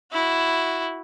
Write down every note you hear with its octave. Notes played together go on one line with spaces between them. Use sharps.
E4 F#4